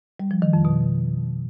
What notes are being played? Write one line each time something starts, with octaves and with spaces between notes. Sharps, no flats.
G3
F3
D#3
F2
B2